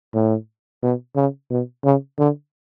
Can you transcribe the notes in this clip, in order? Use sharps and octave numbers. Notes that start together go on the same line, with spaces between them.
A2
B2
C#3
B2
C#3
D3